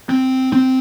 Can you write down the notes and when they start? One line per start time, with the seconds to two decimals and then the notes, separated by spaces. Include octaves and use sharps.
0.09 C4
0.52 C4